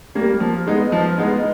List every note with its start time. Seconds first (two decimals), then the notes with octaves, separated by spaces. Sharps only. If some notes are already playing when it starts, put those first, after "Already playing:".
0.15 G3 A#3
0.40 F3
0.67 G#3 B3 D#4
0.92 F3
1.18 G#3 B3 D#4